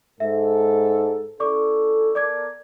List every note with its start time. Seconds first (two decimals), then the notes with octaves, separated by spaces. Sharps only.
0.20 G#2 A4 E5
1.40 C#4 E4 A4 D5 C#6 D6
2.15 B3 A4 A#4 D5 D6 G#6